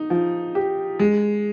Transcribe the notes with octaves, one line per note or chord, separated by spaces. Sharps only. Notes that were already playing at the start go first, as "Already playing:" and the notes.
Already playing: D#4
F3
G4
G#3